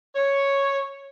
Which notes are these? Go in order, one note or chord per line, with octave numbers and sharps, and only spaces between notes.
C#5